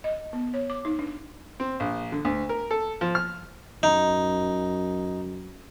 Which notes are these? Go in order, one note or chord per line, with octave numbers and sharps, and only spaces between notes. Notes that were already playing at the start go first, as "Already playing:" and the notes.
D#5
B3
C#5
D6
D#4
D4
C4
A#1
D3
D2
A#4
A4
F3
F6
F#2 D#4